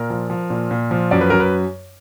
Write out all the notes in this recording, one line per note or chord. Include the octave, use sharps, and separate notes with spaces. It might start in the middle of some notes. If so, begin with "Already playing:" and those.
Already playing: A#2 A#4
F3
F3
A#2
A#2
F3
F#2 D5
B4
F#2 A#4
B4